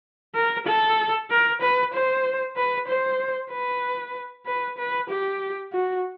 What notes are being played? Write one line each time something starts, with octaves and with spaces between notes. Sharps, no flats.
A#4
A4
A#4
B4
C5
B4
C5
B4
B4
B4
G4
F#4